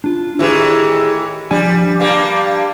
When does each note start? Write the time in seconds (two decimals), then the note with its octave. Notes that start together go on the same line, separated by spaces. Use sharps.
0.04 D4 F4
0.39 A2 D#3 E3 E4 G4 G#4
1.51 F3 G3 D4 G#5
2.00 G2 G3 A#3 F5